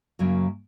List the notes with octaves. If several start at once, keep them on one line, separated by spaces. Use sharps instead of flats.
F#2 C#3 F#3 A#3